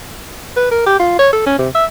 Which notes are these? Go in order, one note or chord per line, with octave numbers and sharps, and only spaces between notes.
B4
A#4
G4
F4
C#5
A4
C#4
C3
E5